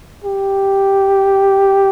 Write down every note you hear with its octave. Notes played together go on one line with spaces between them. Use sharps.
G4